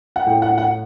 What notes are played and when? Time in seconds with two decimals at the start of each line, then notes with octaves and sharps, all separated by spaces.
0.16 F#5
0.27 A2 G5
0.42 F#5
0.58 F#5